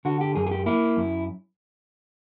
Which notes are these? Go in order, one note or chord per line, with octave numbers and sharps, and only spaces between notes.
D3 F#4
G4
F#2 G#4
G#4
G4
A#3 E4
F#2